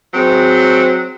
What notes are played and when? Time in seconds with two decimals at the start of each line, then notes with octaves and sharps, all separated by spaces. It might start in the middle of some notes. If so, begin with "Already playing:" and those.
0.13 F#3 G#3 C4